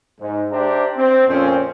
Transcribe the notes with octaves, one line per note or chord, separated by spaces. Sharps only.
G#2
D4 G4 C5 E5 A#5
C4
F2 A#2 C4 C#4